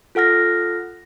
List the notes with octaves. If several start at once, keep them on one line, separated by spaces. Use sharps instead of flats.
F4 A4 F#5 F6 A#6